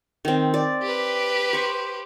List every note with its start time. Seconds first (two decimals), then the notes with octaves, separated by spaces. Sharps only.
0.25 D#3 C4
0.54 D5
0.83 G4 B4
1.53 C5 C#6